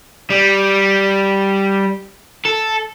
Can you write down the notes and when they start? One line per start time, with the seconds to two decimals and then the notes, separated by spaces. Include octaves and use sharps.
0.30 G3
2.45 A4